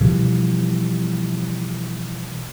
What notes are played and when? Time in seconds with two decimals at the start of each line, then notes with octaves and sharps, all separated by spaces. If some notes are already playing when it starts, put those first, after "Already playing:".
0.01 B2 E3 F3 G3